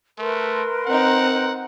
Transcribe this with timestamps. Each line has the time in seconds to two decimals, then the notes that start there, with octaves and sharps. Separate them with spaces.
0.19 A3 A#4 B4 C6
0.86 C4 D#4 F#5